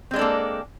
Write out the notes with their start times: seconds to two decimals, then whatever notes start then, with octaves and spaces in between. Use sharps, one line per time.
0.11 C4
0.13 G#3
0.16 D4
0.19 A4
0.21 A#3